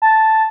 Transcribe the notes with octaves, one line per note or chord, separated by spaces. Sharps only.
A5